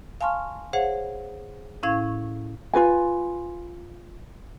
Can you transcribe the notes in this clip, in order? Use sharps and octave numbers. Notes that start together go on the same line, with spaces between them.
F5 G#5 A5 C6 C#6 F6
G#4 C5 C#5 F5 F#5
A2 C#4 E4 F5 C#6 G#6
F4 F#4 B4 G#5